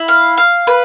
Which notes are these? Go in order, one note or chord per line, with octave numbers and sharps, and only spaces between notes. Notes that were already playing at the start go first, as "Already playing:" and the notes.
Already playing: E4
F5
F5
B4